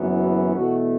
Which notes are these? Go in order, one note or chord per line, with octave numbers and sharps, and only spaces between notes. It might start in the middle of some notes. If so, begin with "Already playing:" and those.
Already playing: F#1 F#2 E3 B3
F#4
E2 B2 A3 F#4